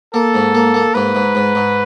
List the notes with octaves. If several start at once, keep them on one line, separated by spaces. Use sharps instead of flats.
A#3 A4
G#2
A#3
A#3
G#2 B4
G#2
G#2
G#2